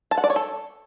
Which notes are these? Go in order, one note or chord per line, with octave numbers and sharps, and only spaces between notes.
A5
F#5
D5
C#5
A4